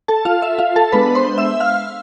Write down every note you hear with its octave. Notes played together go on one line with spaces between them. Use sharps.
A4 A5
F4 F5
E5
F4 F5
A4 A5
G#3 B3 D4 B4 B5
C5 C6
E5 E6
F5 F6